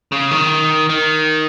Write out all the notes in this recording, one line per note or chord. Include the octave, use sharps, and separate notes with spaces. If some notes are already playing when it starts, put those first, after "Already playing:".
C#3
D#3
D#3